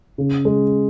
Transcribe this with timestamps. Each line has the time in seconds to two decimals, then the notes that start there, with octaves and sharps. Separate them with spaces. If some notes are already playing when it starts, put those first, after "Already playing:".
0.18 C#3
0.45 G#3